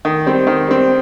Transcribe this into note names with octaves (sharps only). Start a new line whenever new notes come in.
D#3
G3 C4
D#3
G3 C4